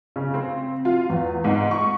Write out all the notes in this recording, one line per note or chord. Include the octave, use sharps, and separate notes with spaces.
C#3
C4
F4
E2
G#2
C#6